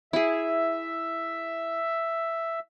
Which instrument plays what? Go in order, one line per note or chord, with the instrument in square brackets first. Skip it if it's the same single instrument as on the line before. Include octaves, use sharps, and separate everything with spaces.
[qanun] E4 G#4 [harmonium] E5